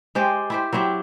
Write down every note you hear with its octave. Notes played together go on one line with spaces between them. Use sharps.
G#3 G4 C5 D5
E4 G4 C5
F#3 C4 E4 G4